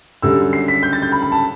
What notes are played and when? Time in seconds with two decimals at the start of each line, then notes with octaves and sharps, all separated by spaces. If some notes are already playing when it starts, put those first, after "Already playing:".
0.22 F#2 D3 G3 E6
0.53 C7
0.68 B6
0.83 G6
0.93 A6
1.02 G6
1.12 B5
1.22 B5
1.32 A5